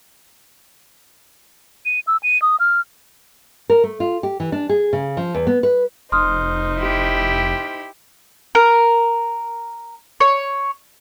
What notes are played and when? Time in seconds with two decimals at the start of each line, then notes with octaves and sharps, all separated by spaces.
1.86 D#7
2.07 E6
2.23 D#7
2.42 D#6
2.60 F6
3.70 A#4
3.84 A3
4.00 F4
4.23 G4
4.40 E3
4.52 D4
4.69 G#4
4.93 C#3
5.17 F3
5.34 E2
5.47 B3
5.63 B4
6.12 F1 D#4 C5 C6 D#6 F6
6.77 E4 G4
8.55 A#4
10.20 C#5